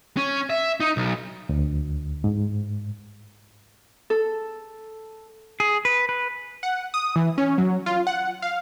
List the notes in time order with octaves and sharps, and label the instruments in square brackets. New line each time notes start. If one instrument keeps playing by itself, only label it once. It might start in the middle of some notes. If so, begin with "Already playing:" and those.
[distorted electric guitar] C#4
E5
D#4
B1
[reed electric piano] D2
G#2
[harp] A4
[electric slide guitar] G#4
B4
B4
[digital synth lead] F#5
D#6
E3
C#4
F#3
F4
F#5
F5